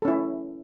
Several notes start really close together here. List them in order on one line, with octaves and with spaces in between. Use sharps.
A4 C#4 E4